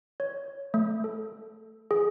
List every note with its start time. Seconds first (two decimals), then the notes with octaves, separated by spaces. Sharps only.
0.20 C#5
0.74 A3
1.04 A4
1.91 G#4